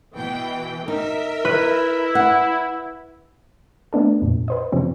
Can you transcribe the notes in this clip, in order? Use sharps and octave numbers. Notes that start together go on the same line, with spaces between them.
B2 E3 G5
D#4 A#4 E5
E4 B4
F#5
A3 B3 D4 A4
F2 A#2
B4 C5 D#5
F#2 C3 F3 C4 C#4